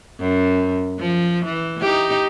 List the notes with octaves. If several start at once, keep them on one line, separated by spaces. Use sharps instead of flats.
F#2
F3
E3
D#4 G4